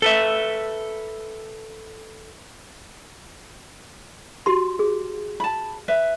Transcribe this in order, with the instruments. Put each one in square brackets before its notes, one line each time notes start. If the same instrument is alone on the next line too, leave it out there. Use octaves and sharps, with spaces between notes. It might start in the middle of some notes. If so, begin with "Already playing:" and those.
[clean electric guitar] A4 B4 E5
[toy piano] F#4 G4 C6
G#4
[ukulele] A5 B5
B4 E5